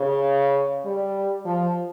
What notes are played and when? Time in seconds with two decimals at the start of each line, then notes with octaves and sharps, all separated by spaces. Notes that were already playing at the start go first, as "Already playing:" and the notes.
Already playing: C#3
0.84 G3
1.45 F3